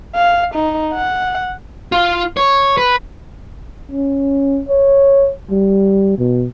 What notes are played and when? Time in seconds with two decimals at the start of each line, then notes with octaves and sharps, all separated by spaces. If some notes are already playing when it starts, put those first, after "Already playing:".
0.16 F5
0.55 D#4
0.94 F#5
1.92 F4
2.37 C#5
2.78 B4
3.91 C#4
4.69 C#5
5.50 G3
6.18 B2